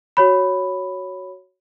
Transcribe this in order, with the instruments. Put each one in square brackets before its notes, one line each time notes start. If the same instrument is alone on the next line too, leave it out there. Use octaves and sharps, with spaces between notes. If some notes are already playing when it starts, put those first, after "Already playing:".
[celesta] F#4 C#5 B5